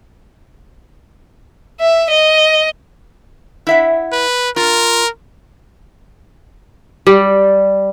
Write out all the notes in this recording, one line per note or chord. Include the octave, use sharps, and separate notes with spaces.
E5
D#5
E4 E5 F#5
B4
F4 A#4
G3